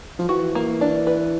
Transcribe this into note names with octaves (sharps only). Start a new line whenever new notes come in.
F3
E3 F#4
A#3
D4
B4